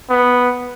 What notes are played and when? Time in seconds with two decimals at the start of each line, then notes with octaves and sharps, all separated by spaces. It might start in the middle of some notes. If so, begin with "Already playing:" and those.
0.10 B3